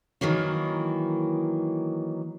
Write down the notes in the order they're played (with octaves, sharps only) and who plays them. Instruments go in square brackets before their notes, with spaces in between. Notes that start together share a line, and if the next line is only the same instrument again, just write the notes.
[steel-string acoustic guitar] D#3 E3 F#3 A#3